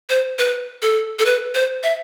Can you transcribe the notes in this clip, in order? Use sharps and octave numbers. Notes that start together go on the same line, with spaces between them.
C5
B4
A4
A4
B4
C5
E5